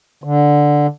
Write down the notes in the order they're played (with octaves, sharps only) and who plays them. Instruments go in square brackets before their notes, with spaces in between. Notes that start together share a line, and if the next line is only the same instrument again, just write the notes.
[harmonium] D3